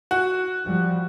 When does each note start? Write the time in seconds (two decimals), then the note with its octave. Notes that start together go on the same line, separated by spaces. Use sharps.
0.11 F#4
0.63 F3 G3